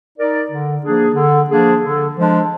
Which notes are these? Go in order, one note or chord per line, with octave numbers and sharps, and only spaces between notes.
D#4 A#4 D5
D3
F3 A#3 D4 G#4
D3
F3 A#3 D4 G#4
D3
F3 G#3 D4